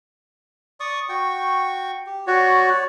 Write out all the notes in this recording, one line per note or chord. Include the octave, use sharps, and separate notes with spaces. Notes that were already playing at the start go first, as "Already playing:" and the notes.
D5 C#6 D#6
F#4 G5 C#6
G4
F#4 C#5 D5